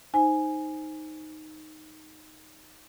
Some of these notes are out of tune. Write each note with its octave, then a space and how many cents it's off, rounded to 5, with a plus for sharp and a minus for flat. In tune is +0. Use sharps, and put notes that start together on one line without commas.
D#4 +0 C5 +0 G#5 +0